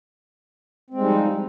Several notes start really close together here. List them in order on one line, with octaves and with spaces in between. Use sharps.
C4 G#3 G3 D#4 F3